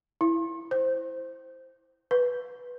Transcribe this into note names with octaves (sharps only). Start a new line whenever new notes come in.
E4
C5
B4